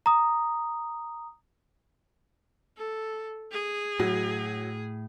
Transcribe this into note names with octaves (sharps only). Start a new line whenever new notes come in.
A#5 D#6
A4
G#4
A2 F#3